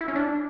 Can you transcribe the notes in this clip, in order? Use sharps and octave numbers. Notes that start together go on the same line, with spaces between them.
E4
C#4
D4